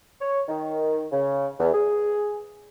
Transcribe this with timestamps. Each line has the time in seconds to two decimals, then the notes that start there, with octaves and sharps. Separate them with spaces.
0.21 C#5
0.48 D#3
1.12 C#3
1.59 E2
1.74 G#4